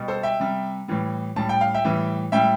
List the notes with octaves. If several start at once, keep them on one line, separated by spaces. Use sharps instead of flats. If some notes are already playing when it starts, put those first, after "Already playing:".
Already playing: B2 G3
A4 C5
E5 G5
C3 G3
A2 E3 G3
A2 G3 A5
G5
F5
E5 G5
A2 E3 G3
A2 G3 E5 G5